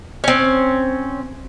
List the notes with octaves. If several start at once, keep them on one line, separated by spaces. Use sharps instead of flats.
C4 C#4